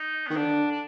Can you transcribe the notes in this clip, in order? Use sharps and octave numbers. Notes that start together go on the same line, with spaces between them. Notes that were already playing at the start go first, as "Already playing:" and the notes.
Already playing: D#4
D#3 B3
D3 D4
D4